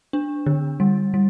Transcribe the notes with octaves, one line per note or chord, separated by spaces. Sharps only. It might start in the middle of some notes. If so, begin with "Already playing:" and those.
D4
D3
G3
G3